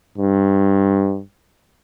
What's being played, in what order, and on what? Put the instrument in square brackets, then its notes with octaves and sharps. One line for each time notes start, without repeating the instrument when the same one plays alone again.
[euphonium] G2